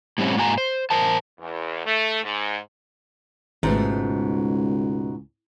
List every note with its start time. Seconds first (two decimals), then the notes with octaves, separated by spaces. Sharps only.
0.18 A2 G3 C4 C#4
0.36 G#2 A#3 F#4 G#5 A#5
0.58 C5
0.90 A#4 C5 A5
1.39 E2
1.86 A3
2.23 G#2
3.63 G#1 C#2 G#2 B2 A3